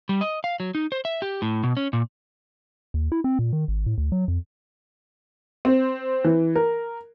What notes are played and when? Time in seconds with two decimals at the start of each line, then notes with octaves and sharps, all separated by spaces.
0.09 G3
0.21 D#5
0.44 F5
0.60 F#3
0.75 D#4
0.92 C5
1.05 E5
1.22 G4
1.42 A2
1.63 B2
1.77 C#4
1.93 A#2
2.94 D#2
3.12 E4
3.24 C4
3.39 A#2
3.53 D#3
3.68 G#1
3.86 A2
3.98 D2
4.12 F#3
4.28 F2
5.65 C4
6.24 E3
6.55 A#4